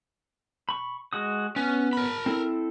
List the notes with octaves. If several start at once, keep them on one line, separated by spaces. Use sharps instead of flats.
B5 C#6
G#3 F#4 D#6
B3 C#4
A#4 B5
C4 E4 A4